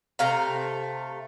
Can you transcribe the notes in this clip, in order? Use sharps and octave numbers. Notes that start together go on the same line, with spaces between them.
C3 A3 F5 A#5